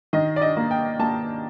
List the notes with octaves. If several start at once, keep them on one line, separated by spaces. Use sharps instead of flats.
D#3 D#5
D5
D#5
A#3
G5
A#3 A5